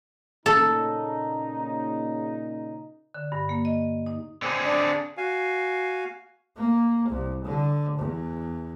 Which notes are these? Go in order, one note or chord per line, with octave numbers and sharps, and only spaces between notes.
A#2 C#3 D#4 A4
D3
G2
A#3
D#5
D#4
D3 C4 G#4
D4
F#4 F5 G#5
A#3
C2
D3
E2